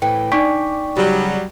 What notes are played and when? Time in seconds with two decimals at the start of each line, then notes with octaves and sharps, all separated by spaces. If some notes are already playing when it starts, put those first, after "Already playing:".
0.02 A2 E3 G5
0.32 D4 D#4 G5 C#6 B6
0.96 C#3 F#3 G3